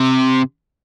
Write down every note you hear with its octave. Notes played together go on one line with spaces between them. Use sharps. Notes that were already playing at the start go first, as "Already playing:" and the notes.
Already playing: C3